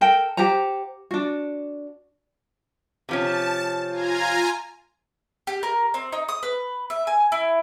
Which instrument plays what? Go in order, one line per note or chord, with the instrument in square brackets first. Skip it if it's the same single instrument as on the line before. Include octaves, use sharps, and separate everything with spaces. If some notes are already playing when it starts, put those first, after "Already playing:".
[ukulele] A4 A#4 G5
G4 C5 F#5 A#5
D4 F#4
[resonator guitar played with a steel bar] C3 F3 C#4 [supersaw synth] A5
[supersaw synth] F4 G#5 A#5
[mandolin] G4
A#4
C4
D#4
D#6
B4
E5
G#5
E4